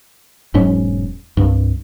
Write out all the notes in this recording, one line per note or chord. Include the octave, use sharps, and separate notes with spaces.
E1 G#2 F#3 C#4
C2 G2